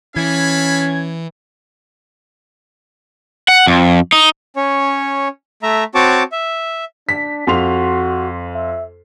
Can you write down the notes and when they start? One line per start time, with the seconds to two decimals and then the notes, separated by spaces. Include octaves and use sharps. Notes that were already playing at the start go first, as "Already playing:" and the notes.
0.16 E3 C#4 A4 F5 B5 G#6
3.48 F#5
3.67 F2
4.12 D#4
4.56 C#4 C#5
5.63 A3 E5 A#5
5.95 C4 F#4 C#5 A5 D6
6.32 E5
7.09 D4 B6
7.47 F2 F#4 C6 F7
8.55 E5